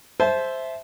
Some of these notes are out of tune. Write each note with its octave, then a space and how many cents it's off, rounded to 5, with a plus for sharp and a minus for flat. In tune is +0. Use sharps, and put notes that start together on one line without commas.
C5 +0 E5 +0 A5 -30